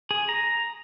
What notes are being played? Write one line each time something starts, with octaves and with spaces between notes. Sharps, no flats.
G#4
A#5